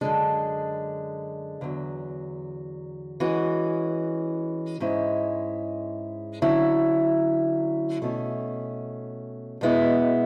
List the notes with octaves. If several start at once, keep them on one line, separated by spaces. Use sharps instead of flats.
F#2 D3 G#3 D4
E2 D3 F#3
E3 G#3 C#4 F#4
G#2 G#3 C#4 E4
D3 F#3 C#4 E4
B2 A3 C#4
B2 G#3 B3 E4